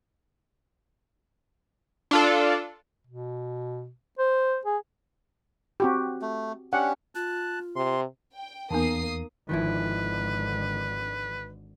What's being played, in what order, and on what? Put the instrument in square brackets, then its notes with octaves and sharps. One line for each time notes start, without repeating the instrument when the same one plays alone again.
[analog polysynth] D4 F4 A4
[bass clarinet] B2
C5
G#4
[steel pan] C4 F#4 G4
[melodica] A3
[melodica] C#4 D4 G4 [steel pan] F#5
[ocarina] F4 [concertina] A5 F#6
[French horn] C3 [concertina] C6
[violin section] G5
[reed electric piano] E2 [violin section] A#3 D#6 C7 [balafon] B3 D#4 A5
[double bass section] G#1 D3 [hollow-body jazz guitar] D#3 F3 E4 [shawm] B4